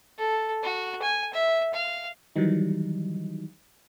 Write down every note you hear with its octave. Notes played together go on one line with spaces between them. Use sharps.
A4
F#4
G#5
E5
F5
D#3 E3 F#3 G3 D#4